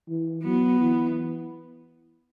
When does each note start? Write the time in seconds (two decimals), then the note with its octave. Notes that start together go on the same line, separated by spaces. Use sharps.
0.09 E3
0.44 F#3 B3
0.80 E3